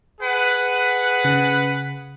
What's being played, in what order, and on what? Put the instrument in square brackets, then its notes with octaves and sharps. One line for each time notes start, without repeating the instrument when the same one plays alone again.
[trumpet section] G#4 B4 F#5
[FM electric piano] C#3